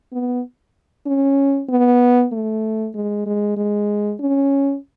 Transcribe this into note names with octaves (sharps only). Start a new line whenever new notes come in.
B3
C#4
B3
A3
G#3
G#3
G#3
C#4